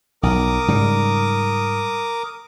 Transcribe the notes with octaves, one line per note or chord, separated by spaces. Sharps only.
B1 A#4 D6 D#6
G#2 C#3 G3